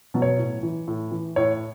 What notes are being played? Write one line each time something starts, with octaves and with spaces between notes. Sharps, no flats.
B2 F#3
C#5
A2
E3
A2
E3
A2 C#5